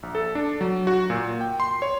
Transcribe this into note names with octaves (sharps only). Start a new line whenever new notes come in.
A#1
A4
D4
F#3
F#4
A#2
G5
C6
C#5